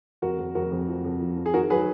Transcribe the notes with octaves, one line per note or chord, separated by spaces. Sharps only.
F2 F#4 A#4
F2
F2 F#4 A#4
F2
F3
F2
F3
F3
G#4
D#3 F#4 A#4
F#3 G#4 B4